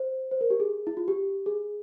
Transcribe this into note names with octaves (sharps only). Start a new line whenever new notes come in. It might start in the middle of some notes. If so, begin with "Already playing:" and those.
Already playing: C5
C5
A#4
G4
G#4
E4
F4
G4
G#4